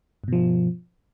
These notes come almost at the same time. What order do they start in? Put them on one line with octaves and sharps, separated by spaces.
G2 B2 F3